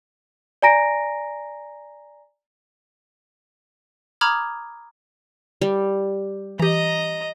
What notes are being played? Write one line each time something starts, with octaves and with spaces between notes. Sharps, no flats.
D5 G#5 A#5 A#6 D7
A#5 B5 D6 D#6 F6 G#6
G3
E3 G4 D#5 A#5